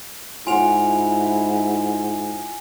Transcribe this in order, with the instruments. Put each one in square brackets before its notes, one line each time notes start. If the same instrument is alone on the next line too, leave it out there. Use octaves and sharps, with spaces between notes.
[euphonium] G#2 [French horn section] E4 [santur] F4 F#5 [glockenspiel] G#5 F7